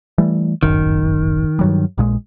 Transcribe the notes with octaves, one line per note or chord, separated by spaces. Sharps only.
E3 G3 A3
D1 G1 F#2 D#3
G2 F#3 G3
A#1 A#2 G#3